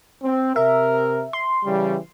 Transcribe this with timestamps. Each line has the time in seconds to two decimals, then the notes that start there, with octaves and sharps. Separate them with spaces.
0.23 C4
0.56 C3 A#4 E5
1.33 C6
1.65 C#3 E3 G3